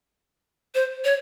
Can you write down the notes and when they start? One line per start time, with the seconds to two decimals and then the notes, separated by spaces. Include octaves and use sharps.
0.75 C5
1.04 C#5